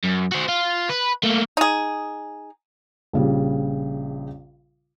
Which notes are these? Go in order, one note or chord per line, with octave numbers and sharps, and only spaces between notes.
F#2
F#4 C5
F4
B4
A3 A#3
D#4 G#4
A#1 C#3 G3